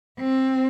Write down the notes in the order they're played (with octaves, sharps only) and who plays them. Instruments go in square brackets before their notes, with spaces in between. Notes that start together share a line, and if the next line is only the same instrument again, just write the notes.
[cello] C4